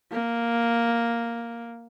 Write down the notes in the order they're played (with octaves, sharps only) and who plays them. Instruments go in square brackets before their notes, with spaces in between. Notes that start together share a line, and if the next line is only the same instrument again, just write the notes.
[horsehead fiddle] A#3